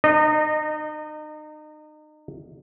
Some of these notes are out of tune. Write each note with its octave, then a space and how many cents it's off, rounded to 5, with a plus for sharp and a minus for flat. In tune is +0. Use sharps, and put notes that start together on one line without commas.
D#4 -35 D#5 -15